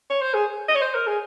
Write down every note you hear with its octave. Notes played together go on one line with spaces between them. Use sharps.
C#5
C5
G#4
D#5
C#5
C5
A#4
G#4